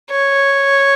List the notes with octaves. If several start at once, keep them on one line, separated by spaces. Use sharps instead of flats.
C#5